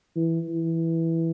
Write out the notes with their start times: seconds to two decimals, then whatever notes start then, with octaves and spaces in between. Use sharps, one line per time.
0.16 E3
0.49 E3